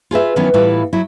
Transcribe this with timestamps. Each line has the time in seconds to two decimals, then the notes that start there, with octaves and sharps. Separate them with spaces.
0.11 F4 G#4 B4 E5
0.36 D#3 E3 F#3 B3 C#4
0.54 A2 E3 G3 E4 F4
0.93 F#3 E4